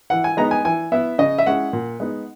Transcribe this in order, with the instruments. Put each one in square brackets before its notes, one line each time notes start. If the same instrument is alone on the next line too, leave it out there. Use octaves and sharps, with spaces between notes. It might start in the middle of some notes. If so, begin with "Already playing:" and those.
[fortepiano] E3 F#5
G#5
G#3 B3 D#4 A#5
G#5
E3 G#5
B3 E4 E5
C#3 D#5
E5
G#3 C#4 E4 F#5
A#2
G#3 B3 D#4